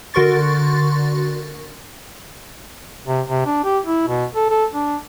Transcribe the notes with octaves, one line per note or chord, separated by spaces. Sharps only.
D3 F#4 A#4 C6 C#6 A6
C3
C3
D4
G4
E4
B2
A4
A4
D4